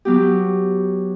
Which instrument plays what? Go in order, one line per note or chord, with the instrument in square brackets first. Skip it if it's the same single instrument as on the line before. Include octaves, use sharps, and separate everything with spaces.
[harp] F#3 B3 G4